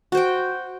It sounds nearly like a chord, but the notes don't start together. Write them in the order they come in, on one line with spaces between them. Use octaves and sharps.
F#4 C5 G5